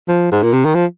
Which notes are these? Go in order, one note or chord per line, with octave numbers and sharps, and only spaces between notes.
F3
G#2
A#2
C3
D#3
F3